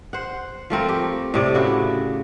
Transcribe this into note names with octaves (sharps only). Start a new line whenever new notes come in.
C5 F#5
F3 A3 C4 A#4
G4
A2 C3 D5
C#3 E4 F#4